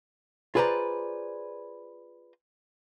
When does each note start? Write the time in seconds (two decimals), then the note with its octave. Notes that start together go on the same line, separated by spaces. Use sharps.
0.55 F4 G#4 B4 C5 D5 A#5